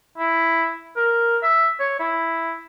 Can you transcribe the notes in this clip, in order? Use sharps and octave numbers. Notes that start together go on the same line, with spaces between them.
E4
A#4
E5
C#5
E4